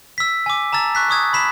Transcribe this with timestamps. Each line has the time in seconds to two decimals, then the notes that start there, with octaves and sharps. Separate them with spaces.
0.18 E6 B6
0.46 G#5 D6
0.73 A5 A#5 E6 A6
0.95 C#6 F#6 B6
1.10 C#6 D#6 G#6
1.33 B5 B6 E7